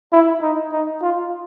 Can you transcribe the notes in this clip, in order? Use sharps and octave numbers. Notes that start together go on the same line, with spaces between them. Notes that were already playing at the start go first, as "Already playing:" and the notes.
E4
D#4
D#4
F4